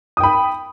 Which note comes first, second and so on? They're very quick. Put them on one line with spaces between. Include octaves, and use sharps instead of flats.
D#6 G5 B5